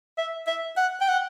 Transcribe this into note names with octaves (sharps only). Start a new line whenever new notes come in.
E5
E5
F#5
G5
F#5